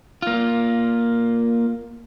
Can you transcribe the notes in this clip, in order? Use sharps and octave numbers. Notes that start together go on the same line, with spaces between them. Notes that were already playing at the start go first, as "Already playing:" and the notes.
A#3 F4